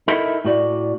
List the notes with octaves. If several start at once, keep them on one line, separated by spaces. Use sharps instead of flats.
D#4 E4 A4 A#4 D#5
A2 F#4 D5